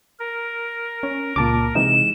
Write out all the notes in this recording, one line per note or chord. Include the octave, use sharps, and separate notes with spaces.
A#4
C#4
C#2 A#2 A5 D6
C3 E3 G#3 D#4 E7